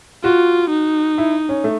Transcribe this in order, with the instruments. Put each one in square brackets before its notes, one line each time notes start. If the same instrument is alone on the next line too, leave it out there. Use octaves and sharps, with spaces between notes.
[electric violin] F4 [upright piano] F#4
[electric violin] D#4
[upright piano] E4
C#4
A3